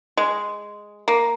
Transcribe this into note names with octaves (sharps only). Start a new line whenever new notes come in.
G#3
A#3